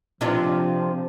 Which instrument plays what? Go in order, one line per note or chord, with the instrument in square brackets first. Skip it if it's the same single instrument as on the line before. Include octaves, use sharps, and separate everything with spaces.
[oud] C3 D4 F4 [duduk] F3